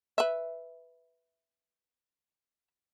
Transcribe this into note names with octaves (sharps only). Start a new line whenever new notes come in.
B4 E5